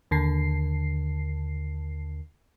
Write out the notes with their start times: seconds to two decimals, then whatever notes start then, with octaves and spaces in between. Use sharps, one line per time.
0.11 D#2 D3 C7